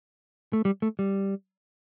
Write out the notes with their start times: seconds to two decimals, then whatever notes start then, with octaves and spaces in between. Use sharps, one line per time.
0.53 A3
0.65 G3
0.82 A3
0.99 G3